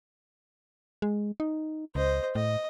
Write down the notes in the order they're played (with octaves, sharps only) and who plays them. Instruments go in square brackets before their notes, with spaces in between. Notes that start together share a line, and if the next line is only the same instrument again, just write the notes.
[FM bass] G#3
D#4
[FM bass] C#2 [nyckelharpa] C5 D#5
[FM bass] A2 [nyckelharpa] D#5